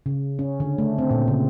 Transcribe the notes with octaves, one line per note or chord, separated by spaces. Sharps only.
C#3
C#4
D3
A3
C4
A#2
C#3